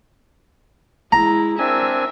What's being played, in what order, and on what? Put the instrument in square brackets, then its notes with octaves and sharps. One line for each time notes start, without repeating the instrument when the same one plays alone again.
[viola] G#3 E4 [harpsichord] A#5
[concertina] C4 D4 G#5 [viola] A#4 E5